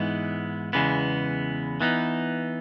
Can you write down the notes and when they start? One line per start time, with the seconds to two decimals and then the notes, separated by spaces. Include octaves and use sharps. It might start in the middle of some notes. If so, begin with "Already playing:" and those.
Already playing: G#2 E3 G#3 B3
0.73 E2 C#3 E3 G#3 B3
1.81 E3 B3 D#4